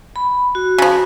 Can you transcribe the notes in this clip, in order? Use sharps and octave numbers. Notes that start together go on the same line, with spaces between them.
B5
F#4
C#3 F3